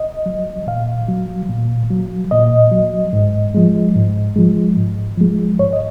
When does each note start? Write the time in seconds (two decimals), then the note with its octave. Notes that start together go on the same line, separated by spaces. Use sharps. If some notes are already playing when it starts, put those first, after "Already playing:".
Already playing: D#5
0.26 F#3
0.67 A#2 F5
1.08 F#3
1.49 A#2
1.90 F#3
2.31 A#2 D#5
2.72 F#3
3.13 G#2
3.55 F3 G#3
3.96 G#2
4.36 F3 G#3
4.77 G#2
5.17 F3 G#3
5.59 G#2 C#5
5.73 D#5